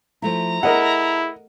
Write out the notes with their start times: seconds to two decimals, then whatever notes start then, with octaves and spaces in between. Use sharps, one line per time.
0.22 F3 A3 E4 A#5
0.63 E4 G#4 A#4 D#5 F#5